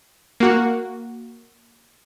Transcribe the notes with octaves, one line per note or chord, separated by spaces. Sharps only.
A#3 F#4